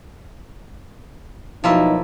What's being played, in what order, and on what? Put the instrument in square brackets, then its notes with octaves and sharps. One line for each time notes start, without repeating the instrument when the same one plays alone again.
[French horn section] B2 F#3 D#4 [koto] F3 A#3 E4